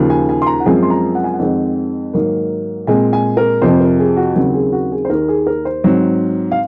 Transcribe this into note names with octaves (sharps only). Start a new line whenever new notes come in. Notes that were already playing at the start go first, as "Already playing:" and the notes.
Already playing: D#2 C#3 F3
G#5
G#5
C6
A#5
F#5
F#2 F3 G#3 C4 G#5
C6
A#5
F#5
G#5
F#5
F2 D#3 G#3 C4
G#2 D#3 F#3 A#3
A#2 G#3 C4 G#5
G#5
A#4
F2 C3 F3 C5
A#4
G#4
F#4
D#2 C#3 F#3 C4 F#4
G#4
F#4
G#4
C5
D#2 D#3 A#3 A#4
G#4
A#4
C5
G#2 F#3 C4
F5